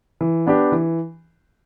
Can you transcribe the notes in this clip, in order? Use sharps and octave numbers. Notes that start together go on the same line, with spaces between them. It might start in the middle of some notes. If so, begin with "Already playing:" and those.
E3
B3 D4 G4
E3